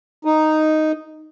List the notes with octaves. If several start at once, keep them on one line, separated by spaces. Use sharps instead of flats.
D#4